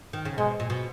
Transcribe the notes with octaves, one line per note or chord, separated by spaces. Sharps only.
D#3
C#3
B2 G#3
A#2
B2